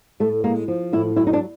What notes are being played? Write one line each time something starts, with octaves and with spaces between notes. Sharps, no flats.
A2 A3
G#3 A#3
F3
A2 E4
F#3 E4
D#4
D4